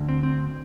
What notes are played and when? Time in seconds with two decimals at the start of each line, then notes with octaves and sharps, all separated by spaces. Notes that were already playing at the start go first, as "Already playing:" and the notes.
Already playing: D2 D3
0.09 C4
0.23 C4